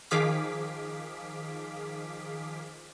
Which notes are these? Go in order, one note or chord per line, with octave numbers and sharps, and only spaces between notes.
D#3 F3 G#4 F5 D6 B6